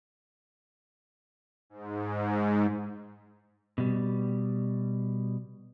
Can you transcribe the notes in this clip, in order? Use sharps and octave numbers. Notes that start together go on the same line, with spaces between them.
G#2
B2 G3